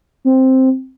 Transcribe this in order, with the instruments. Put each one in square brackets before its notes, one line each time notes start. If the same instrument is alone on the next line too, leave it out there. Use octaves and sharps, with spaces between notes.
[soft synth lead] C4